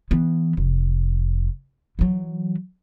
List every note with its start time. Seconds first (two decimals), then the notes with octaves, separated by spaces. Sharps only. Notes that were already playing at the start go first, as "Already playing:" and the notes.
0.11 E3 B3
0.57 F1
1.99 E3 F#3